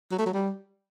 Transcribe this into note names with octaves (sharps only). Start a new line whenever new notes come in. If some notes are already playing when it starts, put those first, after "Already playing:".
F#3
A3
F#3
G3